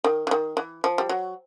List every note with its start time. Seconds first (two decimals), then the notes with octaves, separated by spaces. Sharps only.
0.04 D#3
0.27 E3
0.31 D#3
0.57 E3
0.84 F3
0.98 G3
1.09 F#3